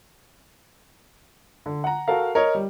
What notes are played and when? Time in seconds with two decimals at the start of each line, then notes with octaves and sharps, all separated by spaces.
1.66 D3
1.84 F#5 A#5
2.08 F#4 A4 A#4 F5
2.35 A#4 C#5 D#5
2.55 G3